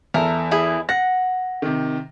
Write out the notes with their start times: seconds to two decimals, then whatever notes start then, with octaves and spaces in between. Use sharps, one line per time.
0.14 E2 A4 A#4 E5
0.51 E4 G#4
0.89 F#5 A#6
1.62 C3 D#3